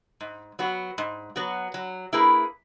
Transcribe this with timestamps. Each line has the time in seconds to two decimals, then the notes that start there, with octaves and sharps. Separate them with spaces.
0.21 G#2
0.59 F#3 B3 F#4
0.98 G#2
1.36 F#3 B3 F#4
1.74 F#3
2.13 A#3 E4 G#4 B4